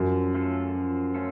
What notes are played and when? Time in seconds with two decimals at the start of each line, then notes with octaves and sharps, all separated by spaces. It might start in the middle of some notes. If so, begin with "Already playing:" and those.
Already playing: F#2 F3
0.34 A3 C#4 F4 A4
0.75 F3
1.14 A3 C#4 F4 A4